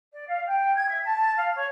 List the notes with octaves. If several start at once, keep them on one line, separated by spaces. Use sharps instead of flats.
D5
F5
G5
G#6
E5
A5
F5
C#5